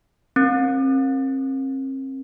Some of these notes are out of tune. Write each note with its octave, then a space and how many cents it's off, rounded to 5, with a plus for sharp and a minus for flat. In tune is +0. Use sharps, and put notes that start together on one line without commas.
C4 +35 A#4 +0